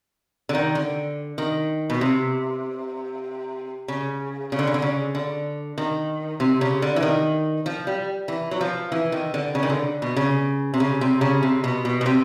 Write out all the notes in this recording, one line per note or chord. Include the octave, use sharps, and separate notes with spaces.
D3
D#3
D3
D#3
B2
C3
C#3
C#3
D3
C#3
D3
C#3
D3
D#3
C3
C#3
D3
E3
D#3
F3
G3
E3
F#3
F3
E3
D#3
D3
C#3
D#3
D3
B2
C#3
C3
C#3
C3
C#3
C3
B2
B2
B2
C3